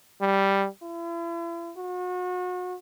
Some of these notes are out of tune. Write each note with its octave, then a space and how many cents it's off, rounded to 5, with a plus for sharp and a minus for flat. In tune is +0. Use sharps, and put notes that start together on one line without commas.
G3 +0
E4 +45
F#4 -35